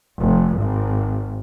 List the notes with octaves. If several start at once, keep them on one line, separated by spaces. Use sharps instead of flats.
F1
G#1